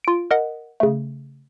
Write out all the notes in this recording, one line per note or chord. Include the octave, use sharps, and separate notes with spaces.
F4 D7
A#4 D#5 F#5
C#3 A3